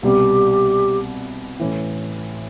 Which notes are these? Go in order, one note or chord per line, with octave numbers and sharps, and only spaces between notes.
C2 B2 G3 G4
A1 A2 E3